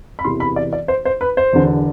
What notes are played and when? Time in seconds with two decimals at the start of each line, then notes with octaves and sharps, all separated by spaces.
0.19 B5
0.25 E1 E2 C3 E3 C6
0.40 B5
0.56 D5
0.73 D5
0.88 C5
1.05 C5
1.21 B4
1.37 C5
1.53 E1 E2 D3